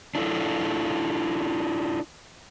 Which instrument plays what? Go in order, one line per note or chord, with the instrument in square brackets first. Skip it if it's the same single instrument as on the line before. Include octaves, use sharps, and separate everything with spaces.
[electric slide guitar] D4 E4 F4 A4